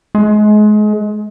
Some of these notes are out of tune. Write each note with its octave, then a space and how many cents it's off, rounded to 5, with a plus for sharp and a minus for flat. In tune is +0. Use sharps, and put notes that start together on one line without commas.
G#3 +30